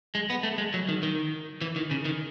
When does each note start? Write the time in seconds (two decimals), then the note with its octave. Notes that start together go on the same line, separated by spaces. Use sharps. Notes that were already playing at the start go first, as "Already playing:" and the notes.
0.15 G#3
0.30 B3
0.43 A3
0.58 G#3
0.74 F#3
0.89 D#3
1.03 D#3
1.61 E3
1.76 D#3
1.91 C#3
2.05 D#3